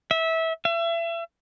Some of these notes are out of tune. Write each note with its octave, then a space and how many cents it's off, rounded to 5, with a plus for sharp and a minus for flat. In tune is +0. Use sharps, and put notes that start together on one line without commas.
E5 -20
E5 +35